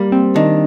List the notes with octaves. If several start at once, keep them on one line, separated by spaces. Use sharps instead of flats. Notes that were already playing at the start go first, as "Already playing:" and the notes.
Already playing: G3 A#3
C4
D#3 D4